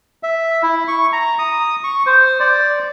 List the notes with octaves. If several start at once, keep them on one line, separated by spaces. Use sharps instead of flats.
E5
E4
C#6
A#5
D#6
C#6
C5
D5